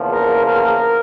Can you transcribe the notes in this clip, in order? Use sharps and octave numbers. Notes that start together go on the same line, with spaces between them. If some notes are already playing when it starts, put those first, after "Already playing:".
Already playing: E2 C#3 F3 A#3
A#4
A#4